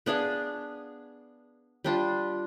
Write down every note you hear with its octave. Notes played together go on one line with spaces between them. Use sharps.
B3 D4 G#4 F5
G3 D4 F4